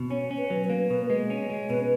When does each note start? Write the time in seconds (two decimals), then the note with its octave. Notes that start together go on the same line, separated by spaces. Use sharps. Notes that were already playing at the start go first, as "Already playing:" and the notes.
Already playing: B2
0.10 C#4 C#5
0.31 C#4
0.38 B4
0.50 F#3
0.64 B4
0.70 A#3
0.90 B2 B4
1.10 G#3
1.30 C#4
1.50 G#3
1.70 B2 B4